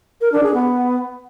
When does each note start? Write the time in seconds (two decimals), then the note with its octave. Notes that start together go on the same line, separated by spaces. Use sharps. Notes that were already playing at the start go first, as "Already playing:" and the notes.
0.21 A#4
0.32 D4
0.43 G#4
0.54 B3